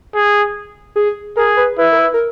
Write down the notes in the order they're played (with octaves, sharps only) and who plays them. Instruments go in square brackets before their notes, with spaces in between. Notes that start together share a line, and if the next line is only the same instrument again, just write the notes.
[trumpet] G#4
[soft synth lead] G#4
[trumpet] G#4 [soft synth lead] A#4
[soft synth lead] B4
[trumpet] E4 [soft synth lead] B4
[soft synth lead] A#4
B4
A#4